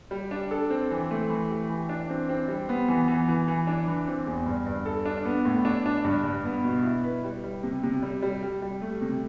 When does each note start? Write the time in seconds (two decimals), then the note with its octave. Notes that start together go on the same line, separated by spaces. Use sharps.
0.11 G3
0.31 D4
0.51 A4
0.70 C4
0.91 E3
1.11 A3
1.30 E3
1.50 G4
1.70 E3
1.89 D4
2.09 C4
2.29 C4
2.48 G3
2.69 B3
2.88 E3
3.08 E3
3.28 E3
3.48 E3
3.67 D4
3.88 E3
4.08 C4
4.27 E2
4.46 G2
4.66 G2
4.86 A4
5.06 D4
5.25 B3
5.45 A2
5.65 D4
5.86 D4
6.04 G2
6.24 G2
6.45 B3
6.64 B2
6.83 E4
7.03 B4
7.24 G3
7.44 G3
7.63 C3
7.83 C3
8.03 G3
8.22 G3
8.43 G3
8.62 G3
8.82 A3
9.02 C3